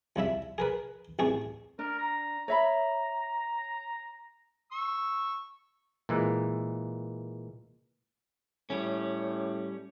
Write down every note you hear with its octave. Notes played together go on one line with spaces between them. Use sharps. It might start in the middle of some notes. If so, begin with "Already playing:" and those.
C2 C#3 E4 E5
G#4 A#4 B4
A1 C4 G#4 C#6
D4 A#4
A#5
C#5 E5 A#5 B5
C#6 E6
A#2 E3 G#3
A2 G3 C#4